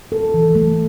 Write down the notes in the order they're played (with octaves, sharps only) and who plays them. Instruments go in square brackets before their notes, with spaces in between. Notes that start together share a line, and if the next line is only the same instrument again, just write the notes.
[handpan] A4
E3
A3